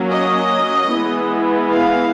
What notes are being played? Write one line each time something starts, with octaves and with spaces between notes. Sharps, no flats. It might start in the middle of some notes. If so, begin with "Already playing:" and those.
Already playing: F#3 A#3 C#4
D#5
E3 G#3 B3
F5